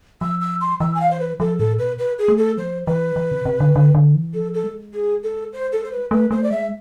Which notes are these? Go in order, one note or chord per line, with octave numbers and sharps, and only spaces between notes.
F3 E6
E6
C6
E3 E6
G#5
F5
C5
B4
F3 A4
A2 A4
B2 B4
B4
G#4
A3
A4
F3 C5
E3 B4
E3
C3
C3
D3
D3
D3
E3
F3 A4
A4
G#3
G#4
A4
C5
A4
C5
B4
A3 B4
A3 C5
D5
G#3 E5